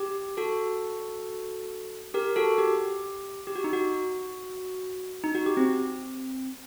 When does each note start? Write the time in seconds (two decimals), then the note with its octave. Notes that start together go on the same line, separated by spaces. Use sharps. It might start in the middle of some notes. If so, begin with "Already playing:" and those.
Already playing: G4
0.37 F#4 A4
2.14 G4 A#4
2.36 F#4 A4
2.58 G4
3.47 G4
3.56 F#4
3.64 D#4
3.73 F#4
5.24 D#4
5.35 F#4
5.46 G4
5.57 C4